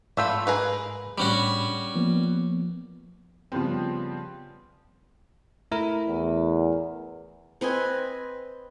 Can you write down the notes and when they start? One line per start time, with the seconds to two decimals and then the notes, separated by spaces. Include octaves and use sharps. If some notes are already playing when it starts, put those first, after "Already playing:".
0.17 G#2 A3 F4 B5 E6 G6
0.47 G#4 A#4 B4
1.18 A2 G3 C#4 D4 F#4 B5
1.96 F3 A#3 B3
3.52 C#3 F3 G3 B3 C4
5.71 A3 E4 A#4
6.08 E2
7.61 C4 B4 D#5 G#5